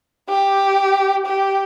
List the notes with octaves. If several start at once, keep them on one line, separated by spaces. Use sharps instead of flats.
G4
G4